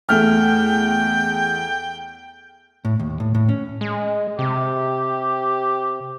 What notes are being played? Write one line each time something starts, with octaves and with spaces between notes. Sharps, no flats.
E2 A3 G5 F6
A2
D#2
A2
A2
C#4
G#3
C3 G4